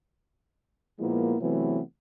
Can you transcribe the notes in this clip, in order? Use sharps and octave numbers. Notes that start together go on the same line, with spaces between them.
A#2 F3 G#3 A#3 B3 E4
C3 E3 F#3 A3 B3 C4